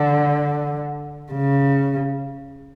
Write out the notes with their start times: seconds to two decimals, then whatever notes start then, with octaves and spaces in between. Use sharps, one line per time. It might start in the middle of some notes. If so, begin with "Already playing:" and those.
Already playing: D3
1.32 C#3